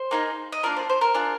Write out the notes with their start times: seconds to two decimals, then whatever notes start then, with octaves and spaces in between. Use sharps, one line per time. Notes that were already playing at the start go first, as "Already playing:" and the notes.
Already playing: C5
0.11 A#3 D#4 G#4
0.52 D#5
0.63 A#3 D4 F4 A#4 D5
0.76 C5
0.89 C5
1.01 A#4
1.14 D4 F4 G#4